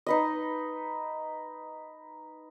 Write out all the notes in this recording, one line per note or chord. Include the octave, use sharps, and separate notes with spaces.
D#4 B4 D#5